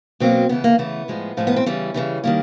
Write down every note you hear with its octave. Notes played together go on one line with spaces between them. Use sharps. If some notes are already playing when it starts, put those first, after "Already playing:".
B2 F#3 A#3 C4
C#3 E3 A3 B3
A#3
C#3 E3 A3 B3
A2 F3 G#3
A2 F3 G#3
B3
C4
C#3 E3 G3 C#4
C#3 E3 G3
D#3 G3 A#3